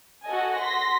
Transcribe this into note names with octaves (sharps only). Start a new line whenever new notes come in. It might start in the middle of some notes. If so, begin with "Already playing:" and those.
F#4 A4 D#5 G#5
C6 A#6 B6